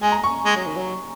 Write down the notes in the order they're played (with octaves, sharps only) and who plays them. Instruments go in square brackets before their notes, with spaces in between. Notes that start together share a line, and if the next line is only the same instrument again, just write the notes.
[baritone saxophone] G#3 [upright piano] G#5
[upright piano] A#5
C#6
[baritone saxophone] G#3
F#3
D#3
F#3